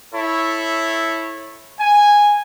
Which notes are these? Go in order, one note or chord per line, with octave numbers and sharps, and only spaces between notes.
E4 A4 C#5
G#5